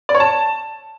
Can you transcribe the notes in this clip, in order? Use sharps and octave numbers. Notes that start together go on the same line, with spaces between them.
D5
C#5
A5